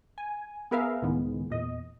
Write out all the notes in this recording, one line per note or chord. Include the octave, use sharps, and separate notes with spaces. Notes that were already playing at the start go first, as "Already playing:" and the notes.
G#5
B3 G#4 A#4 B4 E5 F5
C#2 A2 D#3 G#3 B3
E2 A#2 D#5